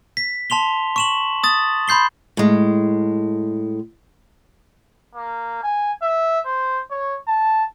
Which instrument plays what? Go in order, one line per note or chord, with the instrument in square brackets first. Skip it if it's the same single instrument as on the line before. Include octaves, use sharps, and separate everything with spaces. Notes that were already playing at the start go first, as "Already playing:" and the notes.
[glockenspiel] B6
A5 C6 F7 G7
C#6 E7 F#7
D#6 A6
B5 C6 G6 C7 G7
[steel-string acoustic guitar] A2 G#3
[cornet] A#3
G#5
E5
C5
C#5
A5